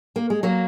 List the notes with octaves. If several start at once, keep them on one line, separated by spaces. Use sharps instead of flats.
A#3
G#3
F#3 A#3